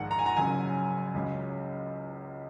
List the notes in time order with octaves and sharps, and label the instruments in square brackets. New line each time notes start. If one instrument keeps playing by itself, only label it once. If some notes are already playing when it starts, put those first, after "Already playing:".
Already playing: [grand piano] A#1 G#2 D#3 F#5
A#5
G#5
A#5
F#1 F#2 C#3 F#3 G#5
C#2 C#3 F#3